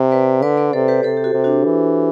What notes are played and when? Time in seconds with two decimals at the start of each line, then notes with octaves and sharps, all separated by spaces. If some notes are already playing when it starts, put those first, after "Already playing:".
Already playing: C3
0.12 B4 D5
0.42 D3 B4 D5
0.57 B4 D5
0.73 C3 A4 C5
0.88 G4 B4
1.03 C3 A4 C5
1.17 G4
1.24 F#4 A4
1.34 C3
1.44 D4 F#4
1.64 E3